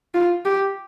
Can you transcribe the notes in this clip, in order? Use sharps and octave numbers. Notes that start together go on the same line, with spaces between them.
F4
G4